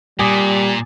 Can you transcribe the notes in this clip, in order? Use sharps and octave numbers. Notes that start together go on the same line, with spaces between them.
A#2 G3 G#5 D6 D#6